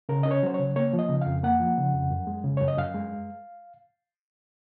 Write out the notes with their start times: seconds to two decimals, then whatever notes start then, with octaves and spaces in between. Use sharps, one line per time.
0.09 C#3 A#4
0.23 C#4 D#5
0.31 C#5
0.43 F#3 C5
0.54 C#3 C#5
0.76 A#3 C#5
0.93 F3
0.99 D#5
1.09 C#3
1.22 F2 F5
1.43 A#3 F#5
1.60 F3
1.77 C#3
1.94 F2
2.10 F#2
2.27 G#3
2.44 C#3
2.57 F#2 C#5
2.68 D#5
2.78 F#2 F5
2.95 G#3